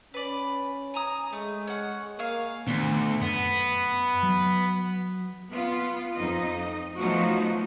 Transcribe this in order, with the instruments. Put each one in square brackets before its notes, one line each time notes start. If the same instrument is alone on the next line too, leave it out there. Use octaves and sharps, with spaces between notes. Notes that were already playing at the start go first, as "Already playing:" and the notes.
[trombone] C#4 [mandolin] B4 D5
[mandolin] G#5 A#5 D#6
[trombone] G#3 [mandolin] A3
[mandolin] C#4 F#5
[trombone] A#3 [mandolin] G#4 C#5 F5
[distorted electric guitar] D2 [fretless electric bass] A#2 D#3 B3
[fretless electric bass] F#2 [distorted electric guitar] B3
[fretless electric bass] F#3
[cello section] B3 F4
F2 D#4 D#5
F3 F#3 A3 B3 D#4 F#4